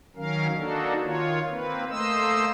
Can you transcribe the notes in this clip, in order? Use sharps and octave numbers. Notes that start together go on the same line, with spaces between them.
D#3 F#3 C#4 A#4 F5
A#3 D4 D#4 F#4 A4
D#3 F4 C#5
A#3 C4 B4
A3 A#3 C5 D#5 E6